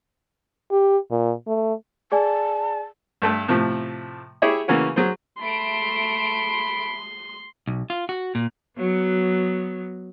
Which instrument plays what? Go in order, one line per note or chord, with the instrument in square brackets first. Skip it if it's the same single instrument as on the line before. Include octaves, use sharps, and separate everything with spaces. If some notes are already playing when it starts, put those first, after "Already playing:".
[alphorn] G4
A#2
A3
[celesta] G#4 D5 G#5 [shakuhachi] A5
[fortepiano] G2 A3 A4
A2 C3 F3 A3
E4 G4 G#4 C#5 E5
C#3 E3 A#3 C#4 F#4
F#3 G#4 C5
[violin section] A3 D7 [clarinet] B5 [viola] C6
[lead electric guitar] B1
F4
F#4
A#2
[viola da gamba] F#3 B3